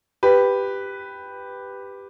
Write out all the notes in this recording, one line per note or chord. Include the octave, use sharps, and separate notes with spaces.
G4 B4